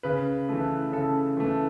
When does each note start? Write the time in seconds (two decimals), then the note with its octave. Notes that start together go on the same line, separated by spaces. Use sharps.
0.03 C#3 B4
0.49 E3 A3
0.92 C#3 A4
1.37 E3 A3